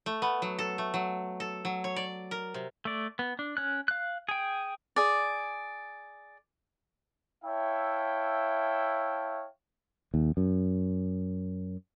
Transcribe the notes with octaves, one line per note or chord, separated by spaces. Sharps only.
A3
B3
F#3
A4
A3
F#3
A4
F#3
C#5
D5
A#4
C3
A3 D5
B3
D4
C#4 F#6
F5 F#6
G#4 G5
G#4 D5
E4 C#5 E5 F5 G5 A5
D#2
F#2